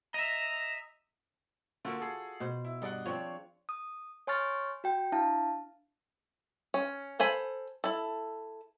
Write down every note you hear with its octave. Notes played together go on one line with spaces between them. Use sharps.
D#5 E5 A#5
D3 A#3 F4 F#4
G#4 A4
B2 C5
E4
G2 D#4 G#4 D5 F#5
F3 C4 D4 C#5 C#6
D#6
C#5 G#5 C6 C#6 F6 A6
F#4 G5
D4 E4 F5 A5
C#4
A4 C5 G#5 B5
E4 A4